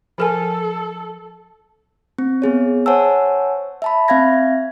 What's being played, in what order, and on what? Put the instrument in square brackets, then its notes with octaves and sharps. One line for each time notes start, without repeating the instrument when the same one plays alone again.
[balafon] F3 A#4 G#5 [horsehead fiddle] A4
[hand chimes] C4
B3 G#4 C#5
C5 C#5 F#5 G#5 A5 E6
E5 A5 B5
C4 E5 F5 G#6 A#6